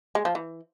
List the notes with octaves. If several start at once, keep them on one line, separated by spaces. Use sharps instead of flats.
G#3
F3
E3